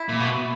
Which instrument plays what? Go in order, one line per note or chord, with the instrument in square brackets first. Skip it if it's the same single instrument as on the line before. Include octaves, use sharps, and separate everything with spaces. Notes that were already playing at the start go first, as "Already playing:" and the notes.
Already playing: [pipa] E4
[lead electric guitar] A#2
B2